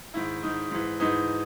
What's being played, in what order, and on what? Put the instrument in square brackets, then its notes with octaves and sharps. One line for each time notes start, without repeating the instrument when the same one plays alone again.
[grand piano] G#2 D#3 E4
G#2 D#3 D#4
G#2 E3
G#2 E3 D#4